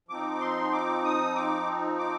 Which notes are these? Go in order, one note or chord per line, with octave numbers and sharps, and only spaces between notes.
F3 C4 D#4 D6
C6
D6
D#6
D6
D6